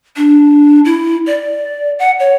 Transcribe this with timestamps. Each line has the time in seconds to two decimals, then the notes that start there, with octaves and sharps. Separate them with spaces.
0.17 D4
0.85 E4
1.27 D5
1.99 F#5
2.20 C#5